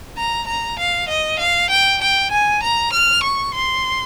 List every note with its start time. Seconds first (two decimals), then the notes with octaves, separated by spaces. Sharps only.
0.17 A#5
0.47 A#5
0.79 F5
1.08 D#5
1.39 F5
1.70 G5
2.01 G5
2.31 G#5
2.63 A#5
2.92 F6
3.23 C#6
3.54 C6